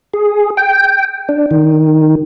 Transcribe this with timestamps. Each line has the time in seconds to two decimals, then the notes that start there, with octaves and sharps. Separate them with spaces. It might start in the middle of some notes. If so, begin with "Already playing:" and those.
0.14 G#4
0.57 G5
1.29 D4
1.51 D#3